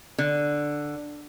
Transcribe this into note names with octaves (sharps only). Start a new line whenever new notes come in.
D3